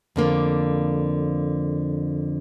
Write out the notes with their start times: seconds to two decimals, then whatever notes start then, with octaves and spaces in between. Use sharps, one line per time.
0.16 F2 D3 A#3